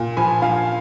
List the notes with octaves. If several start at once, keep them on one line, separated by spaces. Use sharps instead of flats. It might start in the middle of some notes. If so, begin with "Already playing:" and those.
Already playing: A#2
F3 G#5 B5
F3 F5 G#5